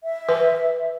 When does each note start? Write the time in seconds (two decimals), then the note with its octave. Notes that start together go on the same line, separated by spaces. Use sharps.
0.04 E5
0.29 B4